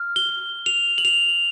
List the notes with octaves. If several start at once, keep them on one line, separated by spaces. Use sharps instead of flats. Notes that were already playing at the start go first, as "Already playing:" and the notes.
Already playing: F6
G7
F7
F#7
F7